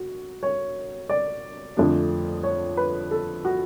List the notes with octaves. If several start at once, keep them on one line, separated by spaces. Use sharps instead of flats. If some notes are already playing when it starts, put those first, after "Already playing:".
Already playing: F#4
C#5
D5
F2 D3 F3 A3 D4
C#5
B4
A4
F#4